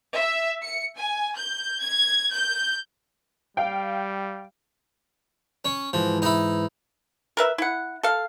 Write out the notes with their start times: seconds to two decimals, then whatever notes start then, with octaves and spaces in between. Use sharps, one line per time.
0.17 E5
0.60 C#7
0.95 G#5
1.35 G6
1.79 G#6
2.30 G6
3.57 G3 F5 G5
5.65 C#4
5.93 G#2 E3 F3
6.22 D#4 E4
7.37 A#4 B4 E5
7.58 E4 F#5
8.03 A4 F5